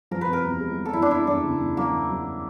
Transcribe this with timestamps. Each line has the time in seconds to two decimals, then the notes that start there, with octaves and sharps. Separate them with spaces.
0.11 F3 A#4
0.21 B4
0.28 C3
0.33 A#4
0.44 E2
0.61 G#3
0.77 F3
0.85 A4
0.93 E2 E4
1.02 D4
1.11 C3 E4
1.27 E2 D4
1.44 C#3
1.60 E2
1.77 F#3 A#3
1.93 E2
2.10 F#3